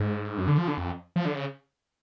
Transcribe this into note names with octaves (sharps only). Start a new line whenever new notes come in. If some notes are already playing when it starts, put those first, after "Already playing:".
Already playing: G#2
F#2
D3
F3
D3
F2
F3
D3
C#3